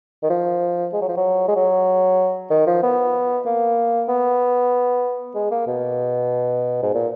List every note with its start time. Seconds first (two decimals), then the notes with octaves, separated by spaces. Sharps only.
0.23 D#3
0.30 F3
0.93 G#3
1.01 F#3
1.08 F3
1.17 F#3
1.48 G#3
1.56 F#3
2.50 D#3
2.67 F3
2.83 B3
3.46 A#3
4.09 B3
5.35 G#3
5.51 A#3
5.67 B2
6.83 G#2
6.94 A#2